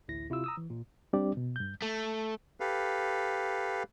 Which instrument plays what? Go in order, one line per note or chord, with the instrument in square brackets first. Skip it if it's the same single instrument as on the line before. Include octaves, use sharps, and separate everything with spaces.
[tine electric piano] A1 D2 E4 A#6
C3 E4 F4 E6
A#5 D#6 E6
E3
A#2
[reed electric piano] G3 C4 D4 G4 D5
B2
G2 G6
[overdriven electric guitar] A3
[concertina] G4 A4 B4 F5